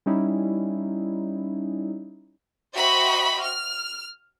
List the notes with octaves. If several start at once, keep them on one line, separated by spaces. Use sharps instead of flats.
G3 C#4 D#4 E4
F#4 C5 D#5 E5 G5 B5
F6